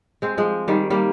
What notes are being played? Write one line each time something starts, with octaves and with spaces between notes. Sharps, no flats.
G#3 C4
F3 G#3
D#3 G3
G3 A#3